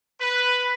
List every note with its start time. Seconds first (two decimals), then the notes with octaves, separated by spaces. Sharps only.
0.21 B4